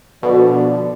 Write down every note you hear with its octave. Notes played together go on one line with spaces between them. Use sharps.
B2 D3 F3 D4 D5